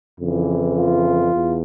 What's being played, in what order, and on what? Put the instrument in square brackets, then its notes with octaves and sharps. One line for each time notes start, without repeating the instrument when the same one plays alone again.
[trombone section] F2 C#3 E3
F4
E2